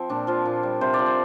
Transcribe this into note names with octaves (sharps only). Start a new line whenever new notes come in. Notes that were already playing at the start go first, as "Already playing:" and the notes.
Already playing: F3 C4
A#2 D4
F3 F4
A#2
G3
C3 C5
D5
F3
C5